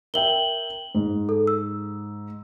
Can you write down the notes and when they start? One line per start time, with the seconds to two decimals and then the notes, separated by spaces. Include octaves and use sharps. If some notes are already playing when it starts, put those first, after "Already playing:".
0.14 A#4 E5 G5 F#7 G7
0.95 G#2
1.29 A4
1.47 E6